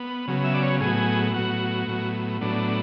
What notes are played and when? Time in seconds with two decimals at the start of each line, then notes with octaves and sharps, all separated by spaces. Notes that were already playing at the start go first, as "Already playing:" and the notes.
Already playing: B3
0.28 C#3 F#3 B3
0.44 E5
0.54 D5
0.63 C#5
0.80 A2 F#3 B3 G#4
1.34 A2 F#3 B3 F#4
1.87 A2 F#3 B3
2.41 A2 F#3 B3 D4